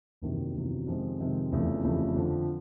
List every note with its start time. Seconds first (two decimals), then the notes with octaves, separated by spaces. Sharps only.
0.22 F#1 E2 C3 D#3 F#3
0.55 F#1 E2 C3 D#3 F#3
0.87 F2 C3 D#3 G#3 C4
1.19 F2 C3 D#3 G#3 C4
1.52 F1 E2 C#3 F3 A3
1.84 F1 E2 C#3 F3 A3
2.16 F2 D3 F3